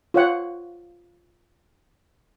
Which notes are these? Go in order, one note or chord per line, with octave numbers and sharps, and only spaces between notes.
F4 C#5 F#5